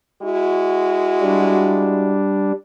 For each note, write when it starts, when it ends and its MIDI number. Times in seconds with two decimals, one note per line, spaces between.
0.22 2.19 56
0.22 2.19 64
0.22 2.19 66
1.21 2.52 55
1.21 2.52 62